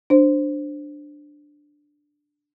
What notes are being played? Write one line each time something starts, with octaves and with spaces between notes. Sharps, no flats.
D4 C5